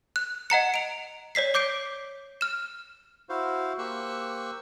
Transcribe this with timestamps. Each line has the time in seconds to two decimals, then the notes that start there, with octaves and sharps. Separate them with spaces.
0.16 F#6
0.50 D#5 F#5 A#5 C#7
0.74 D7 F7
1.35 C#5 D5 B6 C7
1.54 C#5 D6 G6 C7 D7
2.41 F6 E7
3.29 E4 F#4 C5 F5
3.79 A#3 G4 C5 C#6 E6 F#6